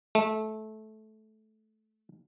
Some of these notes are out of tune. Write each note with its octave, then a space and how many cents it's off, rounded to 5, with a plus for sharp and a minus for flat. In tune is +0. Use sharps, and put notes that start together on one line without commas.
A3 -20